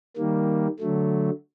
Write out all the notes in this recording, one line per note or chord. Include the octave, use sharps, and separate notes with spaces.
D#3 G3 A#3
D3 F#3 A3